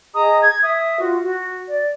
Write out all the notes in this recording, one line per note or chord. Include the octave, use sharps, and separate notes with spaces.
G#4 D#5 A#5 D#6
G#6
E5 D#6
F4 F#4
F#4
D5